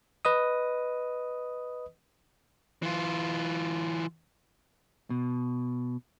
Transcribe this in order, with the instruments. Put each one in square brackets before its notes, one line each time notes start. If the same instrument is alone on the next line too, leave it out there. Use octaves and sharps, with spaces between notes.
[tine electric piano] B4 D#5 D#6
[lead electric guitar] E3 F4
[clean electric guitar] B2